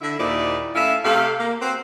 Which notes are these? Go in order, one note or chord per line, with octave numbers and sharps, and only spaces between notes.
D3 E4 E5
D#2 A#2 D#4 E4 C5 D5
A3 C#4 E4 E5 F5
C3 A3 G4 A4 F5
A#3
C4 F#4 B4 C5